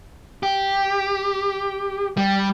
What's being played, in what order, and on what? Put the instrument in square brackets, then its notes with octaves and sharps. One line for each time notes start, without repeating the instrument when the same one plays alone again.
[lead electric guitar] G4
G3